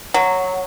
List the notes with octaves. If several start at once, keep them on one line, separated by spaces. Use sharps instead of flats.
F#3